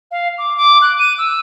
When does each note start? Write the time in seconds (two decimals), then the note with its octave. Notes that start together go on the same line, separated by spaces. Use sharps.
0.11 F5
0.38 D6
0.57 D6
0.82 F#6
0.99 D#7
1.18 E6